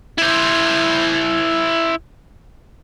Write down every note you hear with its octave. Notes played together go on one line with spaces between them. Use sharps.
E4 C5